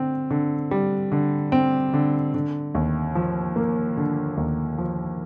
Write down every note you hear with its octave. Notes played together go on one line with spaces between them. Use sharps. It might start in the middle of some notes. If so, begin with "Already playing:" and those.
Already playing: D3 C4
D3
G3
D3
C4
D3
D3
D#2
F3
A#3
D3
D#2
F3